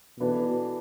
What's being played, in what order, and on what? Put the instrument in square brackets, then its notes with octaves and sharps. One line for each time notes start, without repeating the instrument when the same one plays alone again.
[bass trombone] B2 [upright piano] E3 B3 D4 A4